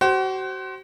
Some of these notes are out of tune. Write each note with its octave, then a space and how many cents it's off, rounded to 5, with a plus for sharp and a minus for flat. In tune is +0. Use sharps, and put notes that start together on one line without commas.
F#4 +35 C5 +10